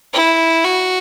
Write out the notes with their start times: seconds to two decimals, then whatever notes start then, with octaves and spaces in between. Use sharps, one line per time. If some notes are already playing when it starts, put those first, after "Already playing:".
0.13 E4
0.64 F#4